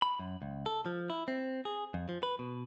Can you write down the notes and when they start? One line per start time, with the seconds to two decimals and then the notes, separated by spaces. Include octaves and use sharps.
0.02 B5
0.19 F#2
0.42 C#2
0.66 A4
0.86 F3
1.10 E4
1.28 C4
1.65 G#4
1.94 F2
2.09 F3
2.23 B4
2.39 B2